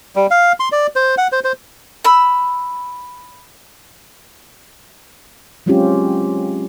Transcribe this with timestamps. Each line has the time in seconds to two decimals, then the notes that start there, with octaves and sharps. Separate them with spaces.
0.16 G3
0.31 F5
0.60 C6
0.72 D5
0.96 C5
1.18 F#5
1.32 C5
1.44 C5
2.04 B5 E6
5.66 F#3 G#3 C4 C#4 F4 G4